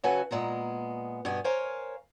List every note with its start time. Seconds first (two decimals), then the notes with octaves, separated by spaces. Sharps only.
0.04 C#3 F#3 F#4 A4 B4 G#5
0.31 A#2 G#3 B3 A#5
1.25 G2 B2 B3 G4 G#5
1.44 A#4 C5 C#5 F5 G#5